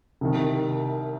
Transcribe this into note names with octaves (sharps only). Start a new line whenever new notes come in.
C2 C3 D#3